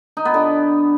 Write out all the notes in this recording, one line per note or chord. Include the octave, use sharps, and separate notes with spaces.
D#4
B3
D3